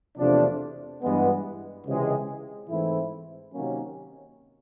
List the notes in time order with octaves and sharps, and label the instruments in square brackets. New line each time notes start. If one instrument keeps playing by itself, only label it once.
[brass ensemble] E2 C3 F3 A3 D4
G2 E3 G#3 B3
C#2 C3 E3 G#3
G#2 E3 A3 C4 E4
C3 D#3 F#3 A#3 C#4